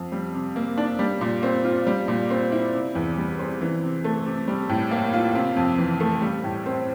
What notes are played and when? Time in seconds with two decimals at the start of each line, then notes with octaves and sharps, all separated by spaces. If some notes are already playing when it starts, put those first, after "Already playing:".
Already playing: F2
0.12 G3
0.34 C3
0.56 A#3
0.78 D4
0.99 G3
1.21 A#2
1.43 C4
1.64 F4
1.87 G3
2.08 A#2
2.30 C4
2.52 E4
2.74 C3
2.95 E2
3.17 G3
3.39 C4
3.61 E3
3.83 C3
4.04 A3
4.26 C3
4.48 G3
4.69 A2
4.91 A#3
5.13 F4
5.35 C3
5.56 F2
5.78 E3
6.00 A3
6.22 G3
6.44 A2
6.66 C4